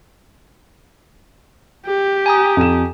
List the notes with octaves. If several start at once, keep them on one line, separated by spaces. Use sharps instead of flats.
G4
G#5 A#5 D#6
F2 E7